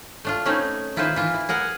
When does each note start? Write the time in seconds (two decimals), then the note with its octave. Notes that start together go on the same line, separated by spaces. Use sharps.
0.25 A3 D4 F4
0.45 A3 C4 C#4 D#4 E4
0.96 D#3 E4 F4 G#4 B4 C5
1.16 E3 F4
1.34 E4
1.49 G#4 A#4 F#5 G#5